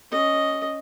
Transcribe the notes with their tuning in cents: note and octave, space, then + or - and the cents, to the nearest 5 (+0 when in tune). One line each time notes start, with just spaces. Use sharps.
C#4 +0 D#5 +0